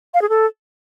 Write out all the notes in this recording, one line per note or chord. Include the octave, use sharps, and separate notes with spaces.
F5
G#4
A4